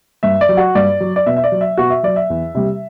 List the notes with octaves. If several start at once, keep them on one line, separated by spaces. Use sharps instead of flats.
G2 E5
D5
F#3
F#4 F#5
G2 D5
F#3
D5
B2 E5
E5
D5
F#3
E5
B2 F#4 F#5
E5
F#3 D5
E5
E2
C3 G3